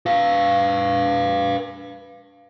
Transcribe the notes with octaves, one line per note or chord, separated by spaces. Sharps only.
B4 F5